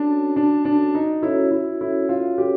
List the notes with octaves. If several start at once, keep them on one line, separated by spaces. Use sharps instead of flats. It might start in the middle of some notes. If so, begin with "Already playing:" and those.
Already playing: C#4 D4 F#4 A4 C#5
C#4 D4 F#4 A4 C#5
D4
D#4
C#4 E4 F#4 A4 C#5
E4
E4
C#4 F4 F#4 A4 C#5
G4